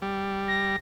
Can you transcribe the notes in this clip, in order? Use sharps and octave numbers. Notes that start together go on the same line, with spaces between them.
G3
A#6